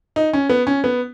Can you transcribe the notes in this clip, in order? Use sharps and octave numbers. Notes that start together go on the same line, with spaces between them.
D#4
C#4
B3
C#4
B3